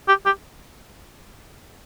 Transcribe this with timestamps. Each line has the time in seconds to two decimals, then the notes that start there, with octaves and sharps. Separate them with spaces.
0.08 G4
0.26 G4